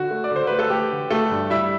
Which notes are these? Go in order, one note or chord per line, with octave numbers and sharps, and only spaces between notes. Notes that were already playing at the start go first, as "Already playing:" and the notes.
Already playing: D3 F#4
A3
D5
D3 C5
A3 B4
A4
A3 G4
D3
A3 A4
G2
G3 E4 E5